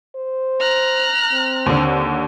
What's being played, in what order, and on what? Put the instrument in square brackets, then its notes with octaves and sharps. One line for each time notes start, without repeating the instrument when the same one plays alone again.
[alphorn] C5
[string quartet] A#5 F6 F#6
[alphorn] C4
[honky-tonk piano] D#2 D3